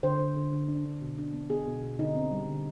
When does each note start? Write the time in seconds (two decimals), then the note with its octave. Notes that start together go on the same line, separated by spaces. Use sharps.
0.03 D3 C5
0.20 D3
0.37 D3
0.53 D3
0.68 D4
0.85 D3
1.02 B2
1.18 D4
1.34 B3
1.50 B3 G#4
1.67 B2
1.83 B2
1.99 D3 D#4
2.15 C4
2.32 G3
2.48 D3